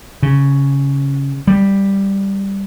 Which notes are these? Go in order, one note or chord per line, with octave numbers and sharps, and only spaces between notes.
C#3
G3